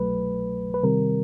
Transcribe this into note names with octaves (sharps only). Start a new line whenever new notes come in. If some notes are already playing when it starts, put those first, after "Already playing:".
Already playing: C2 B2 F#3 A3 B4
B4
C3 D#3 G3 C4 A#4